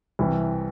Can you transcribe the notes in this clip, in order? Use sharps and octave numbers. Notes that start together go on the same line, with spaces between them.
C2 C3 E3